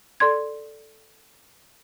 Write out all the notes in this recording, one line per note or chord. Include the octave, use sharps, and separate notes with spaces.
A4 D5 C6 G#6